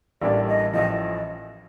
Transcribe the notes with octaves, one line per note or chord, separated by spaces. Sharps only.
A1 A2 G3 A#3 D4 D5
D#5
A1 A2 F3 D#5